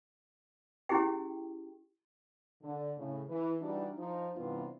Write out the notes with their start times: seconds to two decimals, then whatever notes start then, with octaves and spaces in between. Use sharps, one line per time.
0.89 C#4 E4 G4 G#4 G5
2.63 D3
2.97 A2 C#3
3.28 E3
3.61 E3 G3 D4 D#4 F#4
3.97 F3 D#4
4.36 G2 C3 E3 B3 F4